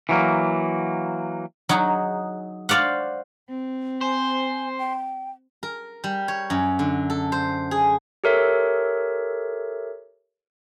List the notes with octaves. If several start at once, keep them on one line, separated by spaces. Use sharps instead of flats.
E3 F#3 A#3
F#3 D#4 F#4 G#4
F#4 C5 D5 F5 F#5
C4
C5 G#5
G5
A#4
G3
C#5
F#2
D3
A4
C5
G#4
G4 A4 A#4 C#5 E5